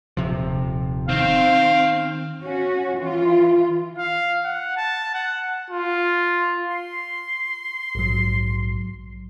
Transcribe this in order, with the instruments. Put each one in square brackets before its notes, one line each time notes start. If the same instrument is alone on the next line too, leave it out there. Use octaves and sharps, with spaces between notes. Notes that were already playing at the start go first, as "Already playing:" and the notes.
[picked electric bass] D#1 C3 F3
[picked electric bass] D#3 [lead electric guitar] C4 [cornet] F5
[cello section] C#4 F#4
E3 F4
[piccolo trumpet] F5
F#5
A5
F#5
[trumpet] F4
[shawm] C6
[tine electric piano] A#1 G#2 F#3